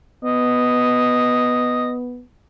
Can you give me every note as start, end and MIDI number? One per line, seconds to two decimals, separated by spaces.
0.25 2.22 59
0.25 1.94 75